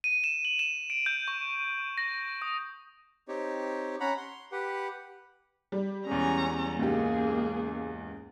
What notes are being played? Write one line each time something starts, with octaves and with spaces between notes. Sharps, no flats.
D#7
E7
F#7
E7
D7
G6
C#6
A#6
D#6
C4 D#4 G4 C#5
C#4 F#5 A#5 B5
C6
G4 B4 F#5
G3
E2 G#3 C#4 A#5
C#2 G#2 A#3 G4 G#4